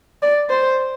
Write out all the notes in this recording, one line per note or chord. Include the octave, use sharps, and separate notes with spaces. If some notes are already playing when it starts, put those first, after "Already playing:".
D5
C5